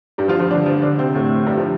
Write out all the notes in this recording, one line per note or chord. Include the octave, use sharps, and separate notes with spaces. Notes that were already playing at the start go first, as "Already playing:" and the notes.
G2 G3
F3 F4
F3 F4
D3 D4
F3 F4
D3 D4
C3 C4
A2 A3
G2 G3
F3